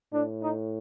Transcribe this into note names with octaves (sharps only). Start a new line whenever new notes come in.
A2 D4
D#4